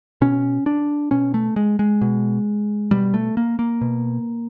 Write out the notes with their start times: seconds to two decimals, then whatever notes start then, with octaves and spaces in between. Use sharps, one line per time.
0.21 B2 C#4
0.66 D4
1.11 B2 C#4
1.34 A3
1.56 G#3
1.79 G#3
2.01 B2
2.91 B2 G3
3.14 A3
3.37 A#3
3.59 A#3
3.81 B2